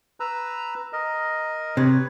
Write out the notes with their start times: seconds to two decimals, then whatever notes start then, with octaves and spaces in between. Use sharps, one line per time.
0.20 B4 A#5 E6
0.93 A#4 D#5
1.77 C3 B4 C#5